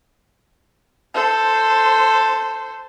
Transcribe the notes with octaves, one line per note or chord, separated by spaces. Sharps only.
A4 C5